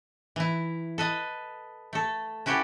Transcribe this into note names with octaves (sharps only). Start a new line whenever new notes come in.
E3 E4
A4 B4 D#5
A3 A4
C#4 E4 F#4 G4 A4 B4